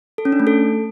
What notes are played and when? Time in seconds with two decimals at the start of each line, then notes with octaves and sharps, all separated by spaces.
0.18 A4
0.25 C#4
0.32 D4
0.40 A3
0.47 A4